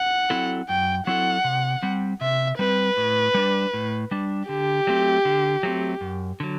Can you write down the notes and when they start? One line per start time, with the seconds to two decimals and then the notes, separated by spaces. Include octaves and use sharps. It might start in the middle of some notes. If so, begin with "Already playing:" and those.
Already playing: F#5
0.30 F#3 C4 E4 A4
0.69 F#2 G5
1.07 F#3 C4 E4 A4 F#5
1.44 C3
1.83 G3 C4
2.21 C3 E5
2.58 G3 C4 B4
2.97 A2
3.35 G3 D4
3.74 A2
4.11 G3 D4
4.49 D3 G4
4.87 F#3 A3 C4
5.25 D3
5.63 F#3 A3 C4
6.01 F#2
6.40 D3 F#3